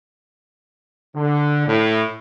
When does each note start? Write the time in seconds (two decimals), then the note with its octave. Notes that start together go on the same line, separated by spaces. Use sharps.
1.15 D3
1.67 A2